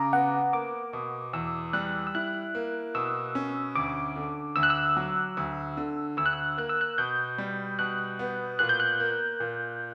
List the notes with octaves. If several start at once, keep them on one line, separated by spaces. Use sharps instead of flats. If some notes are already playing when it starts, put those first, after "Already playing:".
Already playing: C#3 A#5 D6
B3 F#5
A#3 D6
B2
E2 E6
G3 F#6
E6
E4 F#6
A#3
B2 E6
C#4
D2 D6
D3
D2 E6
F#6
E6
F#3
D2
D3
D2 E6
F#6
E6
A#3 F#6
E6
F#6
B2 G6
G3
B2 F#6
B3
A#2 F#6
G6
F#6
A#3
A#2